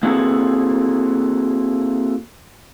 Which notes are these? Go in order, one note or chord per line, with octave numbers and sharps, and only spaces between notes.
A#3 C4 E4 F#4 G#4 A4